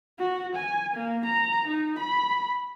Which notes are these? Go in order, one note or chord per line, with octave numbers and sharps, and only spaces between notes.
F#4
G#5
A#3
A#5
D#4
B5